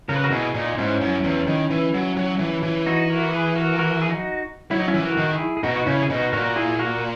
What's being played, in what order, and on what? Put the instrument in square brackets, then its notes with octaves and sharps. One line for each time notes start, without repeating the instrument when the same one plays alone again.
[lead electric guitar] C#3 [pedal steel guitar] A#4
[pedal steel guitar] B4
F#4 A#4
[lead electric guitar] B2 [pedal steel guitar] E4 G#4
[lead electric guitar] A#2 [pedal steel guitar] D#4
[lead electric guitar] G#2 [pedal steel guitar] C#4 E4
[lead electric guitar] F#2
E2
D#3
E3
F#3
F#3
E3
E3
[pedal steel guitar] D#4 F#4
F#4 A#4
G#4 B4
F#4 A#4
F#4 A#4
G#4
D#4 F#4
[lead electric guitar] F#3 [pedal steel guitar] E4
[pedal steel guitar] D#4
C#4 E4
[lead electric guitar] E3
[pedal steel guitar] F#4 A#4
[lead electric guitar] D#3
[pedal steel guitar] E4 G#4
G#4
[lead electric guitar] B2 [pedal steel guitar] D#4 F#4
[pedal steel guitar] F#4
[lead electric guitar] C#3 [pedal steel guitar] C#4 E4
[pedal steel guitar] G#4
[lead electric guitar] B2 [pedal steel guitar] D#4 F#4
[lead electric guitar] A#2 [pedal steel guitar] F#4 A#4
[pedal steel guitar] E4 G#4
F#4 A#4